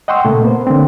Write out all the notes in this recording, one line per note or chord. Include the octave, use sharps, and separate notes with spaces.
D#5 F#5 G5 C6 C#6 E6
A#2 C#3 A3 A4
A#3 B3 C5
D3 A#3 C4